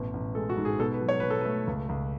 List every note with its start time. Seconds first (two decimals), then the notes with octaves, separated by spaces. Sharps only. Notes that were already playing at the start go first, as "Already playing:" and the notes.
Already playing: A1 B2
0.13 A1
0.35 G#3 A4
0.50 F#4
0.57 G#2
0.65 G#4
0.79 B2 A4
0.94 B4
1.01 F#3
1.09 C#5
1.20 B2 B4
1.30 A4
1.41 A3 B4
1.67 C#2
1.89 C#2